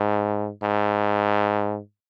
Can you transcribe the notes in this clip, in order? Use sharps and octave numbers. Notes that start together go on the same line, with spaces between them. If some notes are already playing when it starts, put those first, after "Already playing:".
Already playing: G#2
G#2